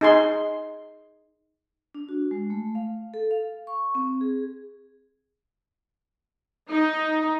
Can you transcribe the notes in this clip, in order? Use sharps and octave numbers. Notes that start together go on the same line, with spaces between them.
D#4 G#4 C6
D4
F#4
G#3
A3
F5
A4
F5
C#6
C4
G#4
D#4